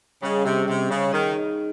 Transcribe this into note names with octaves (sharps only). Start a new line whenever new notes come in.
C#3 G3 C#4 G#4 D#5
C3
C3
C#3
D#3 D#4 G#4 D#5